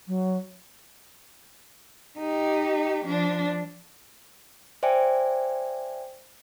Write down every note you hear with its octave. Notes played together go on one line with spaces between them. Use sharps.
F#3
D#4 G4
F3 D4
C5 D5 E5 G5 G#5